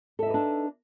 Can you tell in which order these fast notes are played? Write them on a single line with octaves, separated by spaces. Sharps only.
A4 E5 D#4 B4 D4